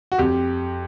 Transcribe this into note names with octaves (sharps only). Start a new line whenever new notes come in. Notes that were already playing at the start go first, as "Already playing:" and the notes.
F#4
F2 G4